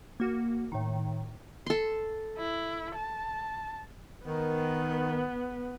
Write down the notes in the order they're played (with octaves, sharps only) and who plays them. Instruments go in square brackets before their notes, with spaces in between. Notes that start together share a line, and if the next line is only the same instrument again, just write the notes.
[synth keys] A#3 F#4
A2 D#3
[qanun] A4 C6
[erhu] E4
A5
[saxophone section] D#3 [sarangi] B3